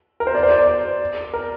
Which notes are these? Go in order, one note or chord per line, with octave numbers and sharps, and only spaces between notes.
A#4
C5
D5
C5
D5
A#4